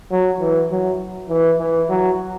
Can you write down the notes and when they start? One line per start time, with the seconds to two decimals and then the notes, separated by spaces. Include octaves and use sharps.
0.11 F#3
0.40 E3
0.70 F#3
1.29 E3
1.59 E3
1.89 F#3